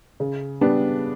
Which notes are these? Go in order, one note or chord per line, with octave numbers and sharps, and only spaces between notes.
C#3
G3 B3 D4